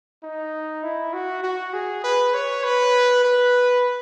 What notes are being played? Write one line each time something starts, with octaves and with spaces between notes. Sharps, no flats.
D#4
E4
F#4
F#4
G#4
B4
C#5
B4
B4